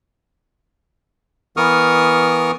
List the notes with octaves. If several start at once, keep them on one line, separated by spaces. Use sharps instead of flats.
E3 B3 A#4 C#6 D#6 F6